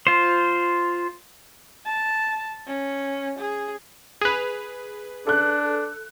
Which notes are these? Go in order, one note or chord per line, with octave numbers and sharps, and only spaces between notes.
F4 C5
A5
C#4
G#4
G#4 B4 D#7 F7
D4 A4 F#6